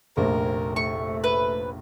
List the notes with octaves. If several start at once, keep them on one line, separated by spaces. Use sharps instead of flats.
F1 A#1 A#3 A#4
A3 C#6
B4